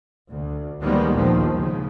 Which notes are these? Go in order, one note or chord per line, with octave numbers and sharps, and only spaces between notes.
D2
D#3 F3 G3 G#3 A#3 B3
A#1 D#2 D#3 F3
G#2 C#3